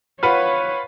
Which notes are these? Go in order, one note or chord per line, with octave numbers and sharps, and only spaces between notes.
F4 B4 C#5 F#5